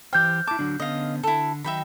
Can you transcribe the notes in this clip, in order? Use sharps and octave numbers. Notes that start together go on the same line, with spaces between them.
E3 G4 C5 G5 F6 G6
E4 A5 D6
D3 F#3 D4
D3 B3 C#4 D#5 F5
D3 E4 A4
D#3 F#3 D#4 E5 G5 B5